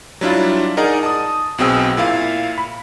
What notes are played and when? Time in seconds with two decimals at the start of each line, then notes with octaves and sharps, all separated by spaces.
0.21 F#3 G3 D4 E4 F4
0.77 D#4 G#4 A#4 D5 D#5 F#5
1.03 A5 D#6
1.58 B1 B2 C4 G#4 G5 E6
1.97 A#2 E4 F5
2.58 B5